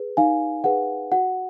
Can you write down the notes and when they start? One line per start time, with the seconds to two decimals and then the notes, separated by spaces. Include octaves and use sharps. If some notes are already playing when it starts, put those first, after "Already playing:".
Already playing: G#4 B4
0.17 D#4 F5 G#5
0.64 G#4 B4 F#5
1.12 F#4 F#5